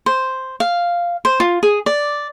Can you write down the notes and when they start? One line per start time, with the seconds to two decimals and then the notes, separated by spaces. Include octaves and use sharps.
0.06 C5
0.60 F5
1.25 C5
1.40 F4
1.63 G#4
1.86 D5